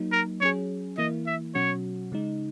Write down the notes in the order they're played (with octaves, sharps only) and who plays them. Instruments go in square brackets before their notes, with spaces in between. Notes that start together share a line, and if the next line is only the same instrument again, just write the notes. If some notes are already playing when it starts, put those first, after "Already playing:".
Already playing: [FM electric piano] F#3 A#3 D#4
[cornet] A#4
[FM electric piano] F#3 C#4 G#4 [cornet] C#5
[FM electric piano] E3 A#3 E4 [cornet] D#5
[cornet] E5
[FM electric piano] B2 F#3 C#4 F#4 [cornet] C#5
[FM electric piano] C#3 G#3 D#4